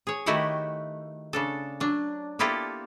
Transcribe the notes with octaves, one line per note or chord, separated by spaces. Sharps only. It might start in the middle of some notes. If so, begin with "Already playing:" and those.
G#4 C#5
D#3 A3 E4 F#4 G4 F#5
C#3 D4 A4
F#3 D4
A#3 B3 E4 F4 G4 A4